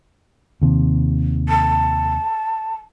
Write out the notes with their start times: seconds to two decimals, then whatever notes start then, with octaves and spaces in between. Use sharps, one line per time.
0.62 D#2 C3
1.49 A5